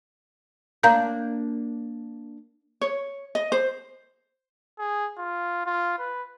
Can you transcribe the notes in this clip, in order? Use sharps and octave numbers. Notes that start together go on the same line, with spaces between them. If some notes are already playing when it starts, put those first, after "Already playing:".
A#3 D4 F5 A#5 G6
C#5
D#5
C5
G#4
F4
F4
B4